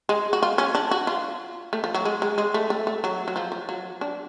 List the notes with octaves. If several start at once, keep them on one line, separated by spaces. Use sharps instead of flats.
G#3
F#4
F4
C#4
D4
F#4
F4
A3
F3
F#3
G#3
G#3
G#3
A3
A3
A3
F#3
F#3
F3
F3
F#3
D4